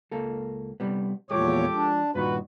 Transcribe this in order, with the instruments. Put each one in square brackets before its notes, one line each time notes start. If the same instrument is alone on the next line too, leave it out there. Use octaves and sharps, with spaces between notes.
[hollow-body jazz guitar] C#2 A#3 A4
C3 G3 B3
[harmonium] E2 A#2 C#5 [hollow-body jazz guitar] F3 G#3 [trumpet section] G4 A4 D6
[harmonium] D4
[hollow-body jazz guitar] G2 A#2 D#3 [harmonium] F#4 [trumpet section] B4